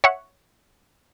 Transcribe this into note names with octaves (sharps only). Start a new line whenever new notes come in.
C#5 E5 F#5